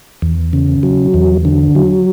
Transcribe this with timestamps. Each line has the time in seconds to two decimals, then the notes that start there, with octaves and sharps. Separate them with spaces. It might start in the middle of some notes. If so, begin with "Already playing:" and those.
0.22 E2
0.53 C#3
0.83 F#3
1.14 E2
1.45 D3
1.75 F#3